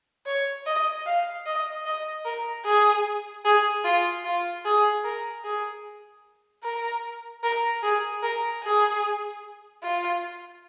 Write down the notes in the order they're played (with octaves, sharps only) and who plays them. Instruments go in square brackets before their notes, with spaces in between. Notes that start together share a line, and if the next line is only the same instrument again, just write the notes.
[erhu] C#5
D#5
F5
D#5
D#5
A#4
G#4
G#4
F4
F4
G#4
A#4
G#4
A#4
A#4
G#4
A#4
G#4
F4